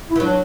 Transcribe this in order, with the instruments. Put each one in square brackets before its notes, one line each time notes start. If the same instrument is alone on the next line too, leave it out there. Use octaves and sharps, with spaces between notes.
[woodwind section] E4
[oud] E3
[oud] F#3 [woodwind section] D4